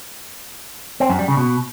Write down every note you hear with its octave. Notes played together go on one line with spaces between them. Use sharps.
C4
F#2
G3
C#3
B2